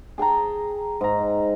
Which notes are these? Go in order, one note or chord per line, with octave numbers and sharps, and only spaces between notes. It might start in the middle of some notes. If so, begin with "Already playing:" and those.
G#4 G5 A5 A#5
G#2 A#5